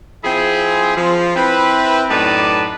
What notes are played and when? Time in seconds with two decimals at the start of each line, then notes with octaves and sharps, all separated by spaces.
0.24 F3 C4 E4 G#4
0.96 F3
1.35 C4 E4 B4
2.10 F#2 A2 D#4 B4 D5 A5